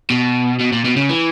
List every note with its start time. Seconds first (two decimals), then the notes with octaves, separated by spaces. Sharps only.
0.10 B2
0.59 B2
0.72 A#2
0.84 B2
0.96 C#3
1.09 E3